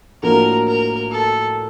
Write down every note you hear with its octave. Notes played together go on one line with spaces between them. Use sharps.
A2 F3 A#3 D4 F#4 A#4
A#4
A4